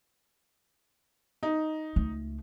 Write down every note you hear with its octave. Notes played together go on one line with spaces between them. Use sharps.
D#4
C#2 A3